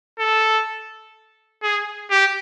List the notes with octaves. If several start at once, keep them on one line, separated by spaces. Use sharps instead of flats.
A4
G#4
G4